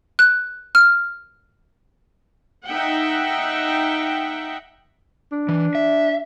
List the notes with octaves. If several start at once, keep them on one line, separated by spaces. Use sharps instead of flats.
F#6
F6
D#4 E5 F#5 G5
D4
E3
E5